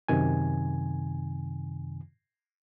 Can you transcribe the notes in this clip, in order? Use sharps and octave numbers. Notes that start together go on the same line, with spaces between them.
F#2 C3 D#3 G#5